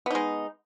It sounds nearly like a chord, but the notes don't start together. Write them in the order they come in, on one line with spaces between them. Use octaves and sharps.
B3 D#4 G#3